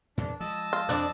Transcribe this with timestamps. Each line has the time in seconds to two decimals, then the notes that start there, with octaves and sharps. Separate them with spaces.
0.18 E2 A#2 D4
0.41 F3 G#3 D#5 A5 E6
0.73 F4
0.89 F2 D4